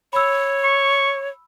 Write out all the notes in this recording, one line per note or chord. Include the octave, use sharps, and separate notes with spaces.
C#5 B5 E6
C#6